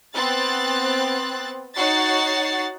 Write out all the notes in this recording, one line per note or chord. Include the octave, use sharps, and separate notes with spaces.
B3 C4 F#6 A6
D#4 F#4 C#5 F#5 A6 C7